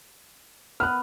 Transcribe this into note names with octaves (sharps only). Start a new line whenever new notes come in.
B3 B4 F6 F#6